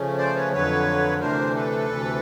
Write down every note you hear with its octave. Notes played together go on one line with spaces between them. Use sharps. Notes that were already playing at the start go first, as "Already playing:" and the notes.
Already playing: C#3 F3 A3 C#4
C5 D5
B4 C#5
F2 D3 F#3 B4 C#5
D2 C3 E3 A3 D4 A#4 C5
A4 B4
D2 C3 E3